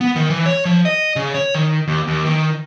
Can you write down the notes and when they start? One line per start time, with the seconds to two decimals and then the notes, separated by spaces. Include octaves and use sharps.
0.01 B3
0.16 D#3
0.30 E3
0.46 C#5
0.65 F3
0.85 D#5
1.16 C#3
1.34 C#5
1.54 D#3
1.88 D#2
2.08 D#2
2.26 D#3